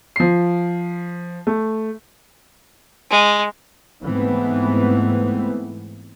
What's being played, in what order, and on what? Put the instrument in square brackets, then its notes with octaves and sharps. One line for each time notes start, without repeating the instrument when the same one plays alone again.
[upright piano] F3 C7
A3
[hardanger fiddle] G#3
[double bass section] G#2 E3 A3 B3 C4